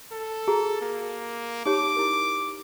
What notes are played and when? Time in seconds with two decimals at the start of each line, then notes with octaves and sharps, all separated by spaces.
0.12 A4
0.48 F#4 G#4 A#5
0.82 A#3
1.66 D#4 G4 C#5 D6
1.97 E4 A#4